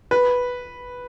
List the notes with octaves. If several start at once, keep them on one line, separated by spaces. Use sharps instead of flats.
B4